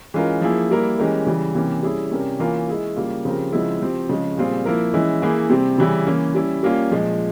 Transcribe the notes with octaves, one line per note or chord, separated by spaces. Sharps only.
E3 G#3 C#4 F4 A#4
F3 A#3 E4 G#4
G3 A#3 E4 A#4
E3 G#3 C#4 G4 A#4
C#3 E3 G3
C3 E3 A#3 C#4
G3 C#4 E4 G#4
C3 G3 C#4 G4 A#4
E3 A#3 C#4 F4 A#4
G#3 E4 G#4
C#3 G3 A#3 F4
C#3 F3 C4 G4 A#4
C#3 F3 G#3 C4 E4
F3 C4 G4
C#3 F3 G#3
A#2 G3 C4 F4 G#4
F3 A#3 E4 A#4
E3 G#3 C#4 E4
E3 A#3 E4 G#4
C3 G3 C4
C#3 E3 G3 C#4 E4
E3 A#3 C#4
G3 C#4 E4
G3 A#3 C#4 F4
A#2 F3 G#3